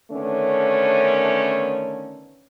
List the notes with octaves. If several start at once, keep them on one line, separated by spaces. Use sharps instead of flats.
D3 D#3 A3 B3 C#4